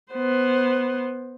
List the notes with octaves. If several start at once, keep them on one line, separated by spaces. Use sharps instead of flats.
B3 C5